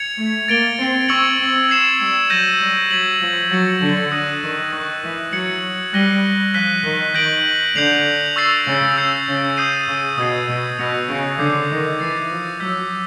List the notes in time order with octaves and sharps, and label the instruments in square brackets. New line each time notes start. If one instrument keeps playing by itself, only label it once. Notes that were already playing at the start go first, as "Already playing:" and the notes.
Already playing: [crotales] G#6 C#7 F7
[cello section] A3
[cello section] A#3 [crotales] A6 D7 G7
[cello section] C4
[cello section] C4 [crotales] C#6 E6 G#6 C#7 F#7
[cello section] C4
[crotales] G#6 C7 E7
[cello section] G3
[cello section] F#3 [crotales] G6 A#6 D#7 F#7
[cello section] G3
[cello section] F#3 [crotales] G#6 B6 D#7 F#7
[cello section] F3
[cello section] F#3 [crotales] A6 C#7 F#7
[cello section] D3
[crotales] D#6 F#6 A#6 D#7
[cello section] D#3
[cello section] D#3 [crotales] C#6 F#6 A#6
[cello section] E3
[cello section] F#3 [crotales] G#6 C#7 F#7
[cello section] G3 [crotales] F#6 A#6 D#7 G7
[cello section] F3 [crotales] F#6 B6 D#7 G7
[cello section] D#3
[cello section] D#3 [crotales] G6 A#6 D7 F#7
[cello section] D3 [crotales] G6 C7 F7
[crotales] C#6 E6 A6 C7 F7
[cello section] C#3
[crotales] E6 G6 C7
[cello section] C#3
[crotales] D#6 G6 C7 D#7
[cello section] C#3
[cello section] B2 [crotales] D#6 G#6 C7
[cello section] B2
[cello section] B2 [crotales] F#6 A#6 C#7 F7
[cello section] C#3
[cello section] D3 [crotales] D6 G6 C7
[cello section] D#3
[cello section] E3 [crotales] A6 C7 D#7
[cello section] F3
[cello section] F#3 [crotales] E6 G6 B6